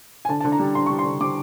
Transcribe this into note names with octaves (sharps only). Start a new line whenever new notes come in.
G#5
D3 A5
A5
D3
A#5
G3
D3 C6
G3 C#6
C6
D3
G3 D6